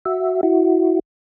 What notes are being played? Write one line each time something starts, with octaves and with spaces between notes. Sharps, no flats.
F#4 E5
E4 F#4